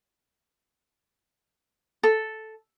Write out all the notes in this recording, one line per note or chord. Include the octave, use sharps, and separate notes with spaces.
A4